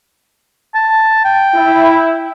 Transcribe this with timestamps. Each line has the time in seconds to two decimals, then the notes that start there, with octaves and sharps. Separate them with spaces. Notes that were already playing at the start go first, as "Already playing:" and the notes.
0.74 A5
1.25 G5
1.55 E4